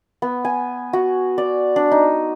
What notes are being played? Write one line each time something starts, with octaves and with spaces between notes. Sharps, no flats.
B3
G#5
F#4
D5
D4
D#4